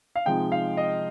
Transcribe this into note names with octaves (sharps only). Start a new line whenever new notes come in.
F5
C3 F3 G#3 D#4 G5
F5
D#5